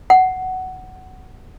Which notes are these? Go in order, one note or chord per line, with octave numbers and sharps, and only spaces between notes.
F#5